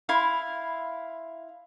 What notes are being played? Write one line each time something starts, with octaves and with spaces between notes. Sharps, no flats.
E4 F5 C6